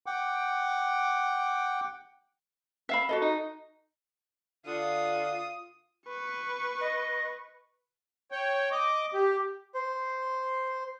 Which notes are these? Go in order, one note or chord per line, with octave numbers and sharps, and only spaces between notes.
F#5 G5 D6
E5 F5 B5
F#4 A4 D#5
D#4
D3 F4 D#6
B4 C#6
D#5
C#5 G5
D#5 D6
G4
C5